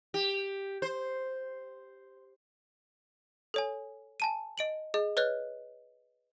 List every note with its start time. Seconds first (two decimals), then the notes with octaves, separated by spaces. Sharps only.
0.14 G4
0.82 C5
3.54 A4 C#5 G#5
4.20 G#5 A5 D#7
4.58 D#5 D7 F#7
4.94 G#4 D#5
5.17 B4 C#5 D#5 F#6